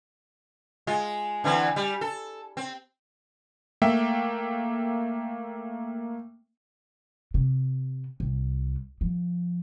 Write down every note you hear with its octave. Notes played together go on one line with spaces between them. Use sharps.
G#3 F4
D3 E3 C4
G3
A4
C4
A3 A#3 E5 G5
C3
C2
F3